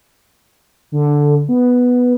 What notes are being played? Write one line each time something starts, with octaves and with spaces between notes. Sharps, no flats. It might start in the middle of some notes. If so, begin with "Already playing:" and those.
D3
B3